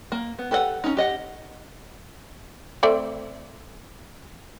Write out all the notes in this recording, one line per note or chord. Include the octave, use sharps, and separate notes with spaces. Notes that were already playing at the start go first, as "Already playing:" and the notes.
A#3
B3
G4 A4 B4 D5 F#5
C#4 D#4
G4 D#5 F#5
A3 C4 D5